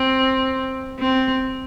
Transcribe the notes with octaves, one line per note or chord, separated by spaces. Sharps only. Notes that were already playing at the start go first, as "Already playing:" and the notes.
Already playing: C4
C4